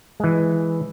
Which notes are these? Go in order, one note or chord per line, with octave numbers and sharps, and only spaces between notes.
E3 G#3